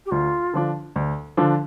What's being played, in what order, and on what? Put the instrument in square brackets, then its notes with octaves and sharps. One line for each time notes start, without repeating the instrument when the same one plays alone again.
[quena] G4
[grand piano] D2 [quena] F4
[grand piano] D3 F3 D4
D2
D3 F3 D4